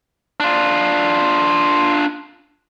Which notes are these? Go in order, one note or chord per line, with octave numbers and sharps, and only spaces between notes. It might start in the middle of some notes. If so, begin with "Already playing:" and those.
D4 F4